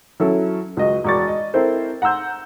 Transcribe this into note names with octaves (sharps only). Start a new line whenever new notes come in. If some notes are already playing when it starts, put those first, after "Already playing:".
F#3 C#4 E4 A4
C#2 F#4 D#5
E1 F#4 D5 C#6 D6 A6
D#5
C4 E4 A4 A#4 C5
F#5 A#5 C6 E6 G6